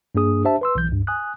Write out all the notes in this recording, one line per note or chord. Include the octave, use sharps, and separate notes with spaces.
G2 A#3 D4 G#4 D#6
D4 G4 C5 E5 A5
B4 C6 E6
B1 E3 G6
C#2 G2
G#5 D#6 F#6